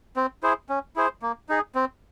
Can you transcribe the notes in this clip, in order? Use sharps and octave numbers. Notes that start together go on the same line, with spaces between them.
C4
E4 G#4 C5
C#4
E4 G#4 C5
A#3
D#4 G#4
C4